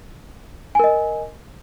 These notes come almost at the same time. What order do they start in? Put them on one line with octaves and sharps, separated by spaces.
G#5 A#4 D#5